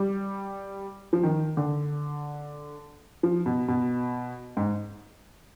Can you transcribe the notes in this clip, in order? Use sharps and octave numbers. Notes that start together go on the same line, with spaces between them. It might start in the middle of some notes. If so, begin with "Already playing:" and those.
Already playing: G3
F3
D#3
D3
F3
B2
B2
G#2